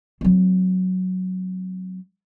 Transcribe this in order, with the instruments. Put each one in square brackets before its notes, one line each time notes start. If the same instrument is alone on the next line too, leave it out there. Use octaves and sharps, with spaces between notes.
[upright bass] F#3 C4